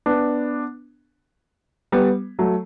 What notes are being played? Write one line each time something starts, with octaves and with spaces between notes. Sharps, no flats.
B3 D4
G3 B3
F#3 A3